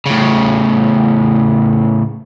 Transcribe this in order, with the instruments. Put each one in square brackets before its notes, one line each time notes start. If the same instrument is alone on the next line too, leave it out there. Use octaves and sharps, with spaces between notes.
[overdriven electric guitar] A2 C#3